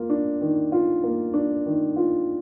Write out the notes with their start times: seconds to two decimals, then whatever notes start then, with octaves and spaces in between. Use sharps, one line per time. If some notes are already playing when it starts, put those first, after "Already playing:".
Already playing: A#3 F4
0.10 D4
0.41 D#3
0.72 F4
1.04 A#3
1.34 D4
1.66 D#3
1.96 F4